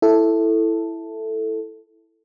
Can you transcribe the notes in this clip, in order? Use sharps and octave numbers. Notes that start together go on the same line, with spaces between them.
E4 A4